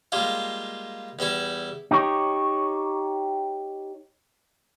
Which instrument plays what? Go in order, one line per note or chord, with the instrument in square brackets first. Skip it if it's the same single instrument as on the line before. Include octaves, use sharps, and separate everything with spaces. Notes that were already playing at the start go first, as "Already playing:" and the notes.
[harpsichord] G3 G#3 A#3 F4
E2 G3 E4 A4
[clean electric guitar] D#4 G4 C#5